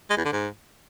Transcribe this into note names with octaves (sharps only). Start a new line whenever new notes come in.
G#3
E2
D3
G#2